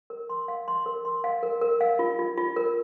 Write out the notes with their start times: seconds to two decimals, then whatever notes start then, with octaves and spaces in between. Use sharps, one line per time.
0.10 A#4
0.30 C6
0.48 F5
0.68 C6
0.86 A#4
1.05 C6
1.24 F5
1.43 A#4
1.61 A#4
1.81 F5
1.99 F4
2.19 F4
2.37 F4
2.56 A#4